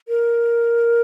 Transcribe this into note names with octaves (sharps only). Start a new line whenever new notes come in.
A#4